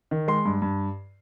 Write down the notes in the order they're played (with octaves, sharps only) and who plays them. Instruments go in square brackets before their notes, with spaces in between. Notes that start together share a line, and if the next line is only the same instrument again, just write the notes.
[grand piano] D#3
G#3 C6
G2
G2